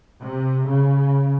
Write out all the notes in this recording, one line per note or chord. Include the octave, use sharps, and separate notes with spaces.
C3
C#3